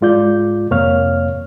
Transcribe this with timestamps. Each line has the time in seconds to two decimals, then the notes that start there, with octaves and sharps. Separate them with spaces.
0.01 G#2 G#3 F4 D5 G6
0.70 F2 C3 A#3 C#5 F5 F6